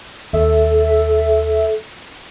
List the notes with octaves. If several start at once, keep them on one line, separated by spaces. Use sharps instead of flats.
D#2 A4 E5